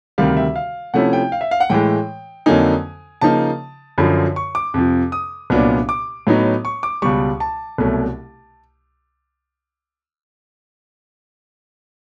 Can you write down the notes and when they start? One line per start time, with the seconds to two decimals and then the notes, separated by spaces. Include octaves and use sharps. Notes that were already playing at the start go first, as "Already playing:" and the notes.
0.18 D2 C3 D#3 G3 F5
0.37 E5
0.56 F5
0.94 C3 F3 A3 C#4 E4 F#5
1.13 G5
1.32 F5
1.41 E5
1.51 F5
1.60 F#5
1.70 A2 E3 G#3 G5
2.46 F2 D3 F#3 A#3 D#4 G#5
3.21 C#3 F3 A#3 D#4 A5
3.98 F#2 D3 F3 B5
4.36 C#6
4.55 D6
4.74 F2 C3 F3
5.12 D#6
5.50 C2 A#2 F#3 B3 D4
5.89 D6
6.27 A2 F#3 B3 D#4
6.65 C#6
6.83 D6
7.02 C#2 B2 G3 C#6
7.40 A5
7.78 C2 B2 F#3 A3